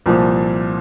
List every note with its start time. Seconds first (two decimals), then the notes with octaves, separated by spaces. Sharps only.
0.06 C2 A#2 F3